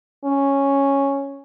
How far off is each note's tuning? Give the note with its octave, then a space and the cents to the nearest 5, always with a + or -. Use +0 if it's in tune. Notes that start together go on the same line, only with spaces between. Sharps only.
C#4 -5